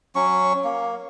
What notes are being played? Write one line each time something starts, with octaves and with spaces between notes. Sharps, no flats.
F#3 C#4 C#6
A#3